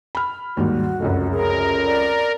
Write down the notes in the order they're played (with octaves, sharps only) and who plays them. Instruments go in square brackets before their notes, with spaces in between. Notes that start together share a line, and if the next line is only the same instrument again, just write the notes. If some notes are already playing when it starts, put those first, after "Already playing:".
[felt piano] B5 F6
[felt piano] D#2 G#2 G3 [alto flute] F#4
[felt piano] F1 C#2 F#2
[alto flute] G#4 [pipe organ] A#4
[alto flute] D5